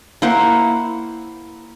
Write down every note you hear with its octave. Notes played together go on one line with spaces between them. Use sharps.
A#3 E4 C5 F#5